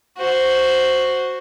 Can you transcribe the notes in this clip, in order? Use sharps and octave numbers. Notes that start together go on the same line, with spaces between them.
F#4 C5